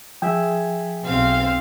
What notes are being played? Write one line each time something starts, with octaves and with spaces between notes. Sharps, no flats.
F3 G#4 E5 G5
B1 C4 F5